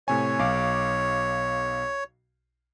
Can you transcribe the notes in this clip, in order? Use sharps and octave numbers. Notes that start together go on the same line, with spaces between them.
A2 C3 C#5 G#5
B1 F5 D6